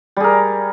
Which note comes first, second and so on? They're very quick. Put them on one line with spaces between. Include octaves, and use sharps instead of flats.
G3 G#4 A#4